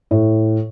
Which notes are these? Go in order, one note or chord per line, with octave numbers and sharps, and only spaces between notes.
A2